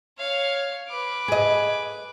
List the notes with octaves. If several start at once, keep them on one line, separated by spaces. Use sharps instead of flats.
C#5 F5
B4 D6
G#4 D#5